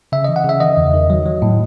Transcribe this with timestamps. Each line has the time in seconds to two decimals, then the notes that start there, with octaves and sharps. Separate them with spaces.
0.12 C#3 E5
0.24 E3 D#5
0.36 F#5
0.44 C#3 E5
0.60 D#3 D#5
0.77 E2
0.94 D#3
1.10 F#3
1.26 F#3
1.42 A2